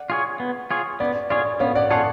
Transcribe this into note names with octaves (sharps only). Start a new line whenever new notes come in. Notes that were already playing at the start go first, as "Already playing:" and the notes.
Already playing: D5 F#5
F4 G#4 C#5
B3
F4 G#4 C#5
B3 D5
F4 G#4 C#5 D5
B3 C#5 F5
D5 F#5
F4 G#4 C#5 F#5 A5